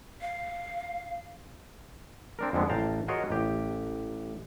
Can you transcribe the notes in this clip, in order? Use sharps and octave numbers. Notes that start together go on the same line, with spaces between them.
F5
C4 D4 A#4
F2 D3 G#3 B3
A1 F5 G5 A5 A#5
F4 F#4 G#4 A#4 C#5 D#5
A1 G4